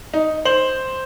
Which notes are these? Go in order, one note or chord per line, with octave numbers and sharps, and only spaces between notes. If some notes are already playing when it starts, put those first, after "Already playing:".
D#4
C5 F#7